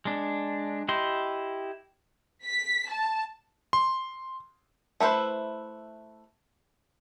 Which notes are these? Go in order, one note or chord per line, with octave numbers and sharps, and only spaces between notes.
G#3 D4
E4 G4 D#5 C6
B6
A5
C6
A3 E4 B4 C5